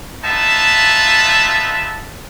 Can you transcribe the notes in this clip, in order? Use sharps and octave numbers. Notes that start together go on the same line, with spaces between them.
B3 D#4 F4 E5 A5